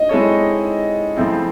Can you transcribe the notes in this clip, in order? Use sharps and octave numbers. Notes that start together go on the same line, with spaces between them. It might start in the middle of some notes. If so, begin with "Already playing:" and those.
Already playing: D#5
G#3 C4 E4 A4 C#5
C#3 F3 A3 C4 E4